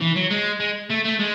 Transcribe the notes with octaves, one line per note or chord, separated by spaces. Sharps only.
E3
F#3
G#3
G#3
A3
A3
G#3